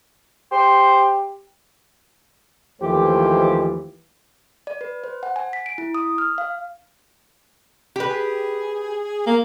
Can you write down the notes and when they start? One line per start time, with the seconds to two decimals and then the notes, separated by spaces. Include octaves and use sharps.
0.52 G4 C5
2.81 D#2 E3 F3 A3 G4 C5
4.67 D5
4.81 B4
5.04 C5
5.23 F#5
5.36 G#5
5.53 B6
5.66 D7
5.78 E4
5.95 D#6
6.18 F6
6.38 F5
7.96 G4 B4
8.10 G#4
9.27 A#3